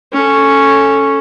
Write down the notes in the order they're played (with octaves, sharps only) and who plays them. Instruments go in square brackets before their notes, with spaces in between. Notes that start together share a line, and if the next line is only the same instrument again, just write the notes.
[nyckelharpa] C#4 A4